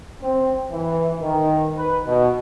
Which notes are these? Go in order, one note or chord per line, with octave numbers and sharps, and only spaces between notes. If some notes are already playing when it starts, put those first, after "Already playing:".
C4
E3
D#3
B4
B2